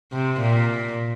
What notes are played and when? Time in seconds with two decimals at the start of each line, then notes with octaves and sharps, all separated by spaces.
0.13 C3
0.41 A#2